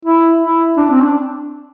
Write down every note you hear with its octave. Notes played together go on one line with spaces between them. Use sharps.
E4
E4
D4
C4
D4